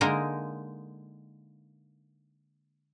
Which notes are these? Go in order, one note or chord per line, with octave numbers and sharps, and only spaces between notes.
D3 G#3 A#3 D#4 A#4